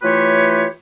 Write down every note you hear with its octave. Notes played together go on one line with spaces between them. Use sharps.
E3 A3 F4 G4 B4 C#5